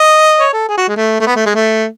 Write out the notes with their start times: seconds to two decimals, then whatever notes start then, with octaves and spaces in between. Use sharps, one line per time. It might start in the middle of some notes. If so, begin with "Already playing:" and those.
Already playing: D#5
0.39 C#5
0.53 A4
0.69 G#4
0.78 F#4
0.88 G#3
0.97 A3
1.20 A3
1.27 B3
1.36 A3
1.46 G#3
1.55 A3